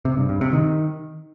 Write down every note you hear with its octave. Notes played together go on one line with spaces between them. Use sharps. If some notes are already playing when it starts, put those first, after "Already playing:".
C3
G2
G2
C3
D#3